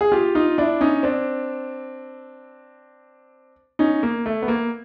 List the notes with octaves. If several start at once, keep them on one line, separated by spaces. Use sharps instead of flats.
G#4
F4 G4
D#4 F4
D4 E4
C#4 D#4
C4 D4
C#4 D#4
A#3
A3
B3
A#3